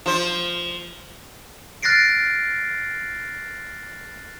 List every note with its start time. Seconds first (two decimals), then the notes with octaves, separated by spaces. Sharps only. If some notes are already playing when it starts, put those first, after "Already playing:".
0.06 F3 C5
1.83 F6 F#6 A6 A#6 C7 D7